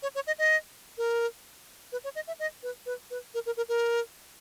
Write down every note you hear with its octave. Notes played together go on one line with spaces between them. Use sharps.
C#5
C#5
D#5
D#5
A#4
B4
C#5
D#5
E5
D#5
B4
B4
B4
A#4
A#4
A#4
A#4